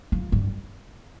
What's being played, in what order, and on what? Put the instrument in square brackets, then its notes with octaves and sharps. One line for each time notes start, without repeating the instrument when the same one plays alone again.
[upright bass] F3
G2